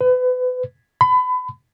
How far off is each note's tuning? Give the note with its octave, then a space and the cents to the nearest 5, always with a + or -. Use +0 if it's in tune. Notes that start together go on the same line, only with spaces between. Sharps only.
B4 +30
B5 +30